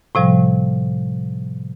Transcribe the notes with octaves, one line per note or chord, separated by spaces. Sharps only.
A2 C3 F3 G3